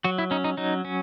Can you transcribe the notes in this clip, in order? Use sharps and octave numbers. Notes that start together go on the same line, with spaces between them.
F#3 F#4
E4
C#4 D#4
D#4
F#3 D#4
C#4